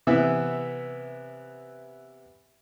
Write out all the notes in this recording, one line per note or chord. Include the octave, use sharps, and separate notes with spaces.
C3 E3 B3 E5